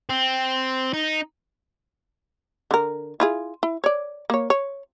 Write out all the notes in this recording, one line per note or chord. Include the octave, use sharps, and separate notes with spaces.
C4
D#4
D3 A#4
E4 F4 G#4
E4
C#5 D5
A#3 C#5
C#5